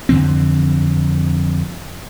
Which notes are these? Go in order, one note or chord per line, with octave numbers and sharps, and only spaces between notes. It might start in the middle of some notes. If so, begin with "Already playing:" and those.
F2 D3 E3 C4